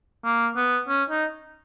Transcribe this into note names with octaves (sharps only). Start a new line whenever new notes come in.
A#3
B3
C#4
D#4